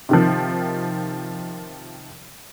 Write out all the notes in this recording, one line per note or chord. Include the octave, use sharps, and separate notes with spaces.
C3 D#3 F3